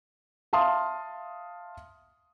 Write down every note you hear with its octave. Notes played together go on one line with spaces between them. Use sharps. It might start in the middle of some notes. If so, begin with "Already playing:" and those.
E5 F5 A5 C6 D#6